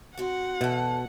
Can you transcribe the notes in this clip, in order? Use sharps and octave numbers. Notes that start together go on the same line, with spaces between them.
C4 F#4 F#5
E2 B2 A4